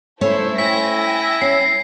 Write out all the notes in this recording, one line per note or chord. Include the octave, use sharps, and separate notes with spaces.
A3 C#4 E4 A4 C5 C#5
E4 G5 G#5 A#6 B6
C#4 C7